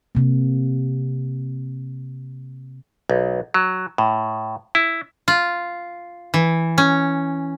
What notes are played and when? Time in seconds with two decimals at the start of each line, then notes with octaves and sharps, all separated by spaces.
0.15 C3 A#3
3.10 B1
3.54 F#3
3.98 A2
4.75 E4
5.28 F4
6.34 E3
6.78 C#4